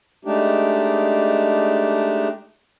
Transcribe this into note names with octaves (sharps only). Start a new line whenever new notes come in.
G#3 A3 D4 D#4 G4